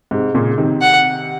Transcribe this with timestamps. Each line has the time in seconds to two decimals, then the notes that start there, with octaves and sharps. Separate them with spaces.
0.11 G#2 C3
0.34 A#2 C#3
0.58 C3 D#3
0.81 F#5